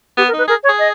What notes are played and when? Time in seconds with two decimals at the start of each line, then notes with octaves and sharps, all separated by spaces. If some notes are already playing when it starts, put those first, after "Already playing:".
0.17 B3 G4
0.28 A#4
0.33 D#4 B4
0.48 G#4 A#4
0.64 C#5
0.69 G#4
0.79 D#5